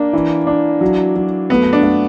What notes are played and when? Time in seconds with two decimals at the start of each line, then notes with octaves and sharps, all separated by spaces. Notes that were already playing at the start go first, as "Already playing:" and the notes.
Already playing: A#3 D4
0.13 E3
0.47 D4
0.81 F#3
1.16 F#3
1.50 A3 B3
1.73 D4
1.83 A3